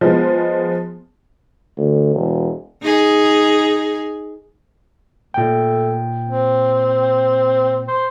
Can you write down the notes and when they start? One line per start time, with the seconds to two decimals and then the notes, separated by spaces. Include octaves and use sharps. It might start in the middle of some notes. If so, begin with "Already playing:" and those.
0.01 F3 G#3 B3
1.77 D2
2.15 E1
2.82 D#4 G#4
5.34 A#2 A3 G5
6.29 C4
7.88 C5